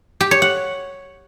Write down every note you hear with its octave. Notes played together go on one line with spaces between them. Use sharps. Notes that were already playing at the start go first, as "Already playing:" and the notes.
G4
C#5
F#5